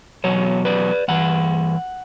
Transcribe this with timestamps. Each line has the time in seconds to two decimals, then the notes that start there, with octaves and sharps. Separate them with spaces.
0.24 E2 B2 F#3 C#5
0.65 B4 D5
1.08 G2 E3 F#5